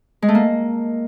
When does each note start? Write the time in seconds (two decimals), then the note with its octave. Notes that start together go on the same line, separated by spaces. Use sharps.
0.22 G#3
0.29 A3
0.35 A#3